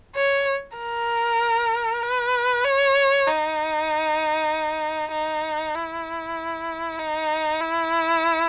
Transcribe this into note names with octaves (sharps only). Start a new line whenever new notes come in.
C#5
A#4
B4
C#5
D#4
D#4
E4
D#4
E4